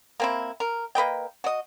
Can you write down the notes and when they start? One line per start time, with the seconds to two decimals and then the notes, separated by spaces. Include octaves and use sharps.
0.20 A#3 C4 E4
0.60 A#4
0.95 A#3 B4 D#5 G5
1.44 F#4 D#5